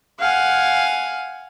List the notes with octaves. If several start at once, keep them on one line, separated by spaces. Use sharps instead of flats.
F5 F#5 G#5